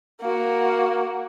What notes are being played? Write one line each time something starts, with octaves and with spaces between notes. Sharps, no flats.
A#3 F#4